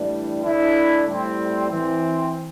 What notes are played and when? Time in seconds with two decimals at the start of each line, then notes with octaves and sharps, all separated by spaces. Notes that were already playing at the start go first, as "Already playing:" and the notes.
Already playing: A2 E3 G3 D4
0.42 D3 A3 D4 E4
1.07 A2 G3 C4
1.69 E3 C4